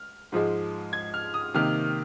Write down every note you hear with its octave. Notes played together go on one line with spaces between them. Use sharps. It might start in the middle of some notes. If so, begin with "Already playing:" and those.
Already playing: F6
G#2 F3 G#3
G#6
F6
D#6
C3 D#3 A#3 F6